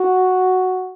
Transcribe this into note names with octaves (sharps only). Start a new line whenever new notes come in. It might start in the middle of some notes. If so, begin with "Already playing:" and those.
Already playing: F#4